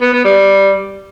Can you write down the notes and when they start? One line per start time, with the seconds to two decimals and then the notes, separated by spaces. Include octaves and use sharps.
0.01 B3
0.13 B3
0.25 G3